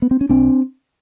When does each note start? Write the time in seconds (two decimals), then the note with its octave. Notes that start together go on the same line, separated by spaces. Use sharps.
0.02 B3
0.11 C4
0.21 C#4
0.29 B1 C4 D4